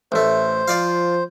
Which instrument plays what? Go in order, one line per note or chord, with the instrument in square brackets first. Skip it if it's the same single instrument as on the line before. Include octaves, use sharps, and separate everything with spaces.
[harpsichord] A1 A3 [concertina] C5
[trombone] F3 [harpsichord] F4 D5 F5